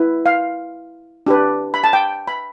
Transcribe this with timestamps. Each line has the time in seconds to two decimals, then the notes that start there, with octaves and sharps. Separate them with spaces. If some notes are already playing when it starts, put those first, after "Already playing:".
Already playing: E4 B4
0.26 F5
1.26 D4 G4 B4
1.74 B5
1.84 A5
1.93 G5
2.28 B5